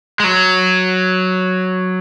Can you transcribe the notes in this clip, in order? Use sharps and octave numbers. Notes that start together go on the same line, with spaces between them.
G#3
F#3